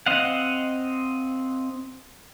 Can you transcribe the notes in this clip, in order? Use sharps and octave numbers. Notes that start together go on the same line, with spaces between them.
C4 D#5 F5 F#5